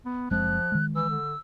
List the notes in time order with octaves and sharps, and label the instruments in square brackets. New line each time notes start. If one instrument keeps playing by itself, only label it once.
[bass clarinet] B3
[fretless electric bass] F#1 G#3 C4 [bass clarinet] F3 [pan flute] F#6
[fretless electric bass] D#3 G#3
[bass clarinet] E3 [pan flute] E6
[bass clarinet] D3